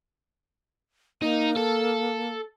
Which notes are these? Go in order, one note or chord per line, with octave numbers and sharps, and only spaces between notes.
A#3 D#4
A4